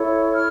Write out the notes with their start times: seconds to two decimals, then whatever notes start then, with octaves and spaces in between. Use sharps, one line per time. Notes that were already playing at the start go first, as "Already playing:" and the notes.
Already playing: E4 A4 C#5
0.35 F6